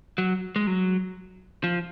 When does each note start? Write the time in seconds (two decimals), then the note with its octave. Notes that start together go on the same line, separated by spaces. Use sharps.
0.18 F#3
0.56 G#3
0.67 F#3
1.64 F3